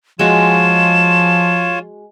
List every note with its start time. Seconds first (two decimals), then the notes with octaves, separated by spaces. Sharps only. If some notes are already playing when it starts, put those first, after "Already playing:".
0.19 F3 G#3 F4 F#4 C#5 E7